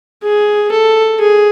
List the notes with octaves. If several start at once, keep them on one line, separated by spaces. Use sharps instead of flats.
G#4
A4
G#4